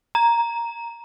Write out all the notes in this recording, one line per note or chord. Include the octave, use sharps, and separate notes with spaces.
A#5